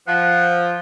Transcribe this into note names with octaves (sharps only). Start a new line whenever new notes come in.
F3 F#5